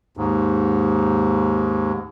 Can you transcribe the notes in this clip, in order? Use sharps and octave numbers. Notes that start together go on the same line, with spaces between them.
D#2 G#2